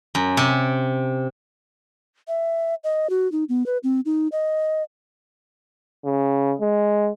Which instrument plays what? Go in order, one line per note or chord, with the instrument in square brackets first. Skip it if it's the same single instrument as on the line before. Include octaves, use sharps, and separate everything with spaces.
[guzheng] F#2
C3
[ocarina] E5
D#5
F#4
D#4
B3
B4
C4
D#4
D#5
[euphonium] C#3
G#3